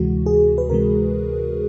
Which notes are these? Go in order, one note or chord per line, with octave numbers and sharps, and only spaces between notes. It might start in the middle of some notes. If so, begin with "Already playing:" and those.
Already playing: D2 C3 E3 G#3 F#4
G#4
B4
D2 C3 E3 G#3 A#4